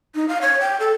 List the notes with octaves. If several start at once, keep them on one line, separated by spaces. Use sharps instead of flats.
D#4
F5
C#5
G5
A4